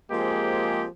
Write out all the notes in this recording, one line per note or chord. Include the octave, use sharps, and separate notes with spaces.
F3 G#3 A#3 C4 G4 G#4